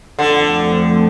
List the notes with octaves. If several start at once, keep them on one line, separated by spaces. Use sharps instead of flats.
F2 D3 F3 A3 C4